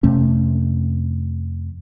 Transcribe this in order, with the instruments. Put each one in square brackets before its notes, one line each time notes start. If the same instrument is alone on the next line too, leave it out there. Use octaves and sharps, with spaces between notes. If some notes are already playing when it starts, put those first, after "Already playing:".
[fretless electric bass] F2 C3 A3 C#4